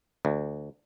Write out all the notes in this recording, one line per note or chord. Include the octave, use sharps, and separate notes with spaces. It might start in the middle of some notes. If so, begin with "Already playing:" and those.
D2